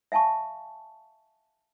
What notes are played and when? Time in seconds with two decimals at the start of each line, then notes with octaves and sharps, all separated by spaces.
0.12 E5 F5 G#5 A5 C#6